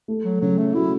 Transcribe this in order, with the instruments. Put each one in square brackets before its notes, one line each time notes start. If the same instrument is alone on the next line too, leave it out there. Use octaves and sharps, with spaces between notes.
[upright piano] A3
[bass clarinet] F#3
[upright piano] C#3 [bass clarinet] F#3
[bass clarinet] A3
[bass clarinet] E4 [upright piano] F#4